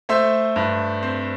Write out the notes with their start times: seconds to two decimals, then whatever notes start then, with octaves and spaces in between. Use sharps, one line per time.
0.09 A3 C5 E5
0.56 G2
1.02 C4 C5